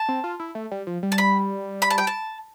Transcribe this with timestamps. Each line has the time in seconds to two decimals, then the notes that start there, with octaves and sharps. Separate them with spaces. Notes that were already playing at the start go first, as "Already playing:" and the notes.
Already playing: A5
0.09 C4
0.24 F4
0.40 E4
0.55 A3
0.71 G3
0.87 F3
1.03 G3
1.12 A5
1.18 B5
1.82 B5
1.90 A5
1.98 G5
2.07 A5